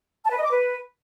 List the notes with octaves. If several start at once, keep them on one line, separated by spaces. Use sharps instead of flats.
A5
B4
D#5
D6
B4